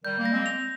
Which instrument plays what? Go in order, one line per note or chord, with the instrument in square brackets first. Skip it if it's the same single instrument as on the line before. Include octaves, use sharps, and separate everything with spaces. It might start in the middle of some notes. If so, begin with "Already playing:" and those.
[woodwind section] D#3 G3 [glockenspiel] G6
[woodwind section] G3 A#3
[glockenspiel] A#6
[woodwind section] G#3 C4
[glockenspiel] F7